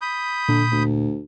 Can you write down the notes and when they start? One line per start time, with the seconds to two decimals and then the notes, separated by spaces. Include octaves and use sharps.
0.01 B5 D#6 G6
0.49 A#2 D3
0.72 D2